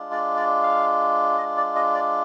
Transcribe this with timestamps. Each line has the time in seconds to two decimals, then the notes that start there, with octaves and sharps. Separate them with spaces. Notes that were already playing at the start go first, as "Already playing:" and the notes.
Already playing: G#3 D4 F4
0.12 D5
0.37 D5
0.63 F5
1.38 D#5
1.57 D5
1.76 D#5
1.94 D5